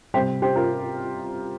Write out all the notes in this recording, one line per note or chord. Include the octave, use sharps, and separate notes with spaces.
C3 G3 G4 C5
G4 C5
F4 A#4